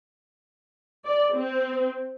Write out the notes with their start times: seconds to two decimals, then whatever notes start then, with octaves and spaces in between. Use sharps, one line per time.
1.04 D5
1.34 C4